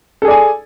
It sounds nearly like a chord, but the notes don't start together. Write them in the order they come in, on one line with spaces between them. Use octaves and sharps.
A4 G#4 D5 G#5